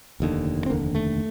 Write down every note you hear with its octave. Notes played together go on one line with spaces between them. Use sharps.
F1 D#2 D3
C4
F1 D#2 D3 A#3
A3